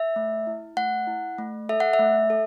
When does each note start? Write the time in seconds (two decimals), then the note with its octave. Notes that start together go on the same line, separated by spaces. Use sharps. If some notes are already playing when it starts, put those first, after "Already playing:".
Already playing: E5
0.16 A3
0.47 E4
0.77 A3 F#5
1.07 E4
1.38 A3
1.69 A4 E5
1.80 F#5
1.93 E5
1.99 A3
2.30 A4